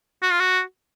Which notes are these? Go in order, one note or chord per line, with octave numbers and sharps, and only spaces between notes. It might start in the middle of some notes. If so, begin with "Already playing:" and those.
F#4
F4
F#4